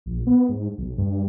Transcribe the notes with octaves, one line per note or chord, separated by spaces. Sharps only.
A#1
B3
G#2
B1
G2